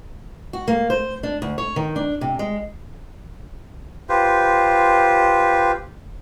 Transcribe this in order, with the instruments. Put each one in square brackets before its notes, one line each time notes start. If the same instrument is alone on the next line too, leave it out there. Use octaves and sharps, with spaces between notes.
[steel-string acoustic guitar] F#4
A#3
C5
D4
D2
C#5
D#3
D4
C3
G#3
[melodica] F4 G4 B4 C5